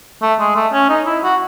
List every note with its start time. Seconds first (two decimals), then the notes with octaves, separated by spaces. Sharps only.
0.22 A3
0.40 G#3
0.56 A3
0.73 C#4
0.89 D#4
1.06 E4
1.23 F#4